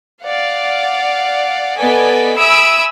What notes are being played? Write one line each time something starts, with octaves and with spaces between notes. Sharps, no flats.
D5 F5 F#5
B3 A4 D5 D#5 G#5 B6
E5 G#5 B5 D#6 E6 D7